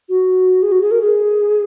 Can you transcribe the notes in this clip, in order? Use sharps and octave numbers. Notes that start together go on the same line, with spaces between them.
F#4
G#4
F#4
G#4
A#4
G#4